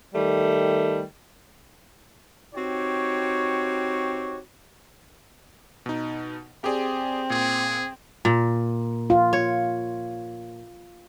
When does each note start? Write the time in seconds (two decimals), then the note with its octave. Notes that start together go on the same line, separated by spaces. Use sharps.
0.15 D#3 G3 A3
2.55 C4 D#4 F#4 G4 C#5
5.86 B2 D#4
6.64 C4 G4 G#4 D5
7.30 A#2 G#4
8.25 A#2
9.10 F4
9.33 C#5